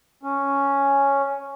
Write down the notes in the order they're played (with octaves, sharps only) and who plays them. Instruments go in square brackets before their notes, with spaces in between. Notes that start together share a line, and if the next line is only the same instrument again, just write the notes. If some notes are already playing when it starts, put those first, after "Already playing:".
[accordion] C#4